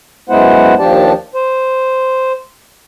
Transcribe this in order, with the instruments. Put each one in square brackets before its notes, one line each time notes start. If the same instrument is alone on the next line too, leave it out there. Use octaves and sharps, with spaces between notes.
[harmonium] F#2 G#3 B3 E4 C5 F#5
D#2 F3 D4 G4 D5 A5
C5